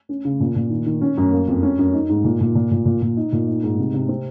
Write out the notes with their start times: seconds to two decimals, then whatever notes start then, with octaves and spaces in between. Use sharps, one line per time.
0.09 C#4
0.25 C#3
0.40 A#2
0.56 A#2
0.70 D#3
0.86 D#3
1.01 C#4
1.17 F#2
1.32 A#3
1.48 F2
1.63 C#4
1.78 F#2
1.93 D#4
2.09 G#2
2.24 A#2
2.40 A#2
2.55 A#2
2.71 A#2
2.85 A#2
3.02 A#2
3.17 D#4
3.32 A#2
3.48 D#4
3.63 G#2
3.78 C3
3.94 C3
4.09 C4